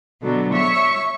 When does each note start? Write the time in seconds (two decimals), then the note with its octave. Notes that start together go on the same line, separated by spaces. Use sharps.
0.21 B2 D3 F#3
0.52 C#5 E5 C#6